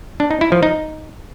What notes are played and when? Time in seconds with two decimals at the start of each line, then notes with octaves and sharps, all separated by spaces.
0.20 D4
0.31 D#4
0.41 E4
0.52 F3
0.63 D#4